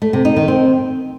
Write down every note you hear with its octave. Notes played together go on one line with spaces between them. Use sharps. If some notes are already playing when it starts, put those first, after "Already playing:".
A3
C3
D#4
D#3
C4